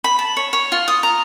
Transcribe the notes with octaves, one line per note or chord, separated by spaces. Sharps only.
B5
A5
C#5
C#5
F4
D#6
A#5